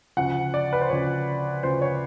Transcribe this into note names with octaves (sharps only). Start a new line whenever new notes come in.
D2 C#3 F3 F#5
D5
B4
C5
D2 C#3 F3 C#5
D2 C#3 F3 C5
C#5